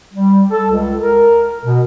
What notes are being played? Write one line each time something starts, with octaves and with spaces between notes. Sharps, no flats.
G3
A4
C#2
A#4
B2